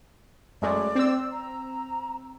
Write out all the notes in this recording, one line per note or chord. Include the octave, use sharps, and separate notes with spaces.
F#2 G#3 A3 D5
C4 E6
A#5